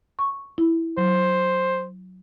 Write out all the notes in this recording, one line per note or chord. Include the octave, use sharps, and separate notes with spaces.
C#6
E4
F#3 C5